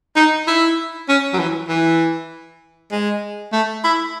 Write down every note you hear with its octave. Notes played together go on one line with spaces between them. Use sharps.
D#4
E4
C#4
F#3
E3
E3
G#3
A3
E4